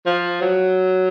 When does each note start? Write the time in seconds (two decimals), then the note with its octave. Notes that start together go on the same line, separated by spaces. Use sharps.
0.06 F3
0.41 F#3